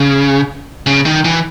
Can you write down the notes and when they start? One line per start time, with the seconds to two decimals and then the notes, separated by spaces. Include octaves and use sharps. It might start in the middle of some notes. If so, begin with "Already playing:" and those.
Already playing: C#3
0.87 C#3
1.06 D#3
1.25 E3